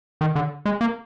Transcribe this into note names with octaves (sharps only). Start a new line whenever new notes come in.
D#3
D3
G#3
A#3